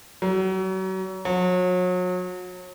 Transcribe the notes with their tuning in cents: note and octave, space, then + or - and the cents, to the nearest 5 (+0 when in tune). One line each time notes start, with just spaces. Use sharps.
F#3 +35
F#3 -35